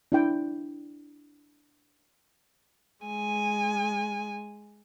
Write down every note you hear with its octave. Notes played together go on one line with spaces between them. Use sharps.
D4 E4 G5
G#3 G#5